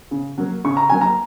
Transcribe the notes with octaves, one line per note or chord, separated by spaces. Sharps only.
C#3
F#3 A#3
C#3 C#6
A#5
F#3 A#3 G#5
A#5